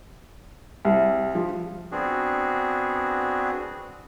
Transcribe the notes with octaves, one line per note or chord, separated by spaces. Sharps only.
C2
F3
B3 C4 D4 F#4 G#4